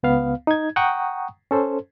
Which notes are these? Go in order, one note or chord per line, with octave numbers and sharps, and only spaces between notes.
C#2 B3 F5
D#4 G#6
F#5 G5 A#5 C#6 D#6
C#4 A4 C5